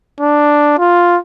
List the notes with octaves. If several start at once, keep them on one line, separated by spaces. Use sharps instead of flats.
D4
F4